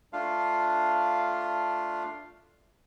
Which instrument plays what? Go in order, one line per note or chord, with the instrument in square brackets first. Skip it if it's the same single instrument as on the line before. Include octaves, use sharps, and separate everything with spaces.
[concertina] A3 D4 F4 F5